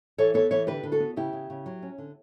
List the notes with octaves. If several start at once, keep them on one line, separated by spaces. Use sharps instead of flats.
E3 A4 C#5
B3 A4 C#5
E3 A4 C#5
D3 G4 B4
D3
F#4 A4
B3
C#3 E4 G4
C#3
C#3
F#3
C#4
D3